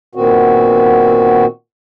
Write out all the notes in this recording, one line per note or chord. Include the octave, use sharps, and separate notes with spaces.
A#2 D#3 B3 C4 F#4